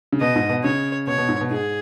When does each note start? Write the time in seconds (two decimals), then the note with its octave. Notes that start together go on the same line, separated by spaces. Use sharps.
0.13 C#3
0.21 B2 D#5
0.36 G#2
0.49 B2
0.64 C#3 C#5
1.07 B2 C#5
1.18 B2
1.29 G#2
1.41 B2
1.51 G#2 G#4